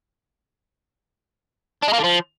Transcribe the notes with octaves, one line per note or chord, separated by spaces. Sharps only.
D4
G#3
A#3
D3
F3